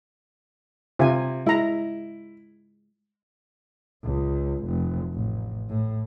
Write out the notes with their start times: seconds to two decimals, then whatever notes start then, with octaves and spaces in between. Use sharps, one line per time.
0.99 C3 F4 G#5
1.46 G#3 E4 A#5
4.03 C#2
4.64 F1
5.13 A1
5.69 A2